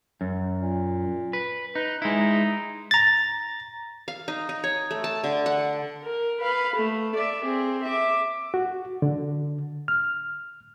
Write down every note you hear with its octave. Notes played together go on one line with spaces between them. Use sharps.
F#2
A#2
B4
D#4 B4
G#3 D#4 E4
A#5 A6
F5
D#4
D#4
C#5
A3
A5
D3
F#5
A#4
B4 F5
A3
D5 E5
C4 G#4
E5 D6
F#4
D3
F6